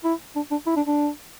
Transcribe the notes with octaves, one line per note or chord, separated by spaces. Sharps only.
E4
D4
D4
E4
D4
D4